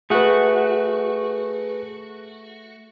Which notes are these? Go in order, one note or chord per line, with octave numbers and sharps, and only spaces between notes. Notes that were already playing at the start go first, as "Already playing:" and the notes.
A3 F#4 G#4 B4